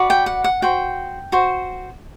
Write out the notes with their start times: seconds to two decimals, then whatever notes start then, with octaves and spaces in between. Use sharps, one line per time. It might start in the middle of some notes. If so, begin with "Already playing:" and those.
Already playing: F#4 B4 D5
0.10 G5
0.26 F#5
0.44 F#5
0.62 F#4 C5 G5
1.32 F#4 C5